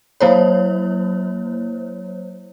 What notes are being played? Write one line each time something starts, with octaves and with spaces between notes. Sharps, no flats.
F#3 A#3 E4 C5 C#5